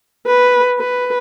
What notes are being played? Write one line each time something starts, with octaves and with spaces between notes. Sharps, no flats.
B4
B4